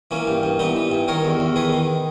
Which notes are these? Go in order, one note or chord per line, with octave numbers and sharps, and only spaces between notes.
E3 A#3 C#4
G2
G2
E3 B3 D#4
E3
G2
D#3 A#4 C#5
E2
E2
D#3 G#4 B4
D#3